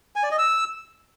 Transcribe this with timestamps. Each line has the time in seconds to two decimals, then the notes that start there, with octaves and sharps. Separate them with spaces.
0.16 G#5
0.23 D5
0.31 D#5
0.38 E6